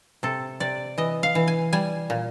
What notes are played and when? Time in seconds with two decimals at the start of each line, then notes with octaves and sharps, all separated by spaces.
0.23 C3 A4
0.60 C3 D5
0.98 E3 D#5
1.23 F5
1.35 E3
1.48 G#5
1.73 G3 G#5
2.10 A#2